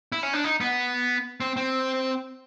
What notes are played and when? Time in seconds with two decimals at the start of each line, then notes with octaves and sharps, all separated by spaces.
0.12 E4
0.23 C#4
0.33 D4
0.44 D#4
0.61 B3
1.40 C4
1.56 C4